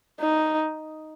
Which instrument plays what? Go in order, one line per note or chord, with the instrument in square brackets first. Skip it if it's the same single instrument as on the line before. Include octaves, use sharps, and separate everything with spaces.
[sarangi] D#4